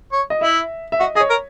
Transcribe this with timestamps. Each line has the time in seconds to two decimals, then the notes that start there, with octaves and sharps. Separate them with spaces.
0.12 C#5
0.30 D#5
0.41 E4 E5
0.92 E5
1.00 F#4 D#5
1.15 G#4 D#5
1.20 C#5
1.30 A#4